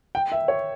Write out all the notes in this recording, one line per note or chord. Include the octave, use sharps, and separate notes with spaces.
G5
E5
C#5